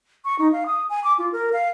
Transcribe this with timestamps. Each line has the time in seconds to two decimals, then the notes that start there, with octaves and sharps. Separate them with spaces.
0.25 C#6
0.39 D#4
0.52 F5
0.66 D#6
0.90 G#5
1.04 D6
1.19 F4
1.32 A#4
1.53 F5